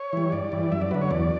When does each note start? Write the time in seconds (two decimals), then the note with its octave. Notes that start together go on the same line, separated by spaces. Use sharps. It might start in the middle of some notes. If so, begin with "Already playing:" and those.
Already playing: C#5
0.13 E3 G3
0.32 G2 D5
0.52 E3 G3
0.72 F#2 E5
0.81 D5
0.91 D3 F#3 B4
1.01 C#5
1.11 E2 D5